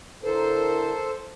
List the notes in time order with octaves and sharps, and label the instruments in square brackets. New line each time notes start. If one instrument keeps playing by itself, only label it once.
[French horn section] D3 E4 A#4 [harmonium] A4 C5